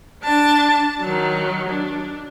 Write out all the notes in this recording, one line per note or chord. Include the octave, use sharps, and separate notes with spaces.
D4 A5
D#3 F#3
D4